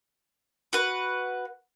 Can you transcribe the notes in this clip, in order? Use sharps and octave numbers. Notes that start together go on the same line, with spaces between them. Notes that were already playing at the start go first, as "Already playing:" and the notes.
F#4 B4